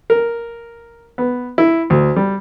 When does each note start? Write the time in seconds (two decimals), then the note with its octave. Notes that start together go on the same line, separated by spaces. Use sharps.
0.10 A#4
1.18 B3
1.58 E4
1.90 D2
2.16 G3